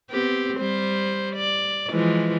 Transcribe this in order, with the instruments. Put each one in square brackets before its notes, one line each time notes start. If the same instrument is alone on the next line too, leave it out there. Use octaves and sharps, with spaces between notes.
[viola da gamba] B3 C4 G4
G3 C5
D5
E3 F3 G#3